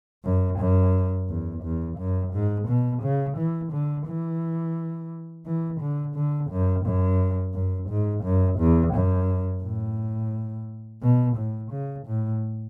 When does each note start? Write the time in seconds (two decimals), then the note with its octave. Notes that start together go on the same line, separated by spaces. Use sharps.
0.25 F#2
0.59 F#2
1.29 E2
1.63 E2
1.98 F#2
2.33 G#2
2.68 B2
3.02 C#3
3.37 E3
3.73 D3
4.07 E3
5.46 E3
5.81 D3
6.16 D3
6.51 F#2
6.85 F#2
7.54 F#2
7.90 G#2
8.24 F#2
8.59 E2
8.94 F#2
9.63 A2
11.03 B2
11.37 A2
11.72 C#3
12.06 A2